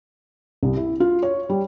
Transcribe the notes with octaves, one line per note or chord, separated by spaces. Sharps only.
C2
E4
F4
C#5
G3